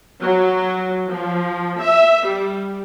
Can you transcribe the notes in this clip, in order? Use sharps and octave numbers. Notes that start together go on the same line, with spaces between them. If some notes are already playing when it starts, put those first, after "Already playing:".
F#3
F3
E5
G3